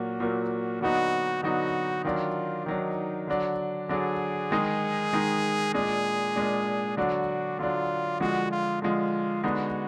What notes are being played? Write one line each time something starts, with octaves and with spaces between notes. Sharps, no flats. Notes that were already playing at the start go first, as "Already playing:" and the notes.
Already playing: A#2 F#3 A#3 F#4
A#2 F#3 A#3
D3 F#3 B3 D#4 F#4
D3 F#3 B3 D#4 F#4
D#3 F#3 D4 F4
D#3 F#3 D4 D#4
D3 F#3 D4
D3 F#3 D4 G#4
D#3 G#3 D#4
D#3 G#3 D#4
A#2 G#3 D4 G#4
A#2 G#3 D4
D3 F#3 D4 F#4
D3 F#3 D4 F4
D3 F3 G#3 F#4
F4
D3 F3 G#3 F4
D3 G#3 B3 D#4 F#4